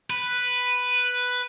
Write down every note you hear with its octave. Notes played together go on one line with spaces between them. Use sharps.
B4